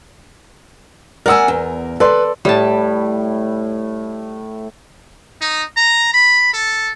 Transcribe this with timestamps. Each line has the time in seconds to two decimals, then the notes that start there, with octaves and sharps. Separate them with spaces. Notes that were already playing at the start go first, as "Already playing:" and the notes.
1.26 A#4 D5 F#5 G#5 E6
1.48 E2
2.00 A4 B4 D5 C6
2.45 A2 G3 A5
5.41 D#4
5.77 A#5
6.14 B5
6.53 A4